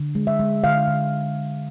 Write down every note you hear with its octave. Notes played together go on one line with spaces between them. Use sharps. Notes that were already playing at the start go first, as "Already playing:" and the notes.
Already playing: D3
G#3
E5
G#3
D3 F5
D3